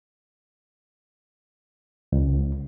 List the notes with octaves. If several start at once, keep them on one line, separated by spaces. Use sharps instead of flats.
C#2